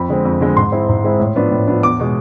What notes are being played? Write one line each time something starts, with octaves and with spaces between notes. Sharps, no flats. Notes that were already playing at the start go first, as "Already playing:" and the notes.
Already playing: F2 B5
D3 G#3 C4
F2
D3 G#3 C4
G#2 C6
G#3 C4 E4
G#2
G#3 C4 E4
A2
F3 B3 D4
A2
F3 B3 D4
E2 D6
B2 G#3